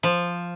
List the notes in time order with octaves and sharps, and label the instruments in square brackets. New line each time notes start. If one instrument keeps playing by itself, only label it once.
[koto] F3